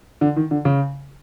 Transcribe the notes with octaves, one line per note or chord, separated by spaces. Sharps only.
D3
D#3
D3
C#3